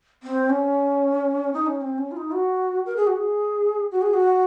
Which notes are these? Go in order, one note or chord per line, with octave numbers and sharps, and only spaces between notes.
C4
C#4
D#4
C#4
C4
C#4
F4
D#4
F#4
A#4
G#4
F#4
G#4
F#4
G#4
F#4